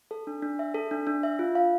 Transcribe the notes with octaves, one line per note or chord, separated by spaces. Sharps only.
A4
D4
D4
E5
A4
D4
D4
E5
F4
F5